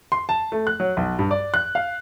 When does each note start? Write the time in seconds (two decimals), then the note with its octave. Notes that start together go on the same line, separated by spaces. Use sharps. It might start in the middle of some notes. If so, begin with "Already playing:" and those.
0.12 C6
0.29 A5
0.52 A3
0.67 F#6
0.80 F#3
0.97 B1
1.19 G2
1.31 D5
1.54 F#6
1.75 F5